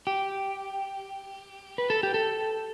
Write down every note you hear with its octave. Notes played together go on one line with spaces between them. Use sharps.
G4
B4
A4
G4
A4